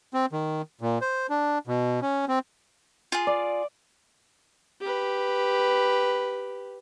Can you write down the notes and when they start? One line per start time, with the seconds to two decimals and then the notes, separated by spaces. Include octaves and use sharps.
0.14 C4
0.33 D#3
0.81 A#2
1.01 C5
1.30 D4
1.67 B2
2.02 C#4
2.28 C4
3.12 F4 G#4
3.27 D5
4.81 G4 B4